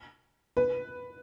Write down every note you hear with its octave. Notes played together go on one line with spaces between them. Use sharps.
B4